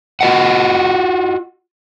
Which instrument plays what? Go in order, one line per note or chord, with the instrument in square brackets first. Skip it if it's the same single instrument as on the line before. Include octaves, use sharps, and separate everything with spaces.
[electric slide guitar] F4 F#4 C#5 D#5 F#5